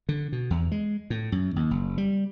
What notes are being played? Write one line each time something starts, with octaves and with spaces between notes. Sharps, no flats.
D3
B2
E2
G#3
A2
F#2
D#2
F#1
G3